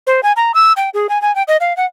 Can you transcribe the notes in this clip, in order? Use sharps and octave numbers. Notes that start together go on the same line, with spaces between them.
C5
G#5
A#5
E6
G5
G#4
G#5
G#5
G5
D#5
F5
F#5